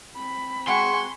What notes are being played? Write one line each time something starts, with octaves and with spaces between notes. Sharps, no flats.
C4 B5
G#3 F#4 G5 G#5 C6 C#6